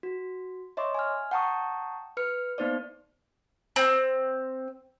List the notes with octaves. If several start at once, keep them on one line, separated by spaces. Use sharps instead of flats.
F#4
C#5 D#5 E5 C6 D6
G#5 F6
F#5 G5 A5 A#5 C#6 D#6
B4 F6 C#7
A#3 B3 D#4 C5 D5
C4